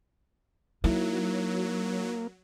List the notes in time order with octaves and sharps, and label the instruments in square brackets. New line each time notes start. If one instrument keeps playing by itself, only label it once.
[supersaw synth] F#3 [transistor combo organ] A#3 [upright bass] D#4 E4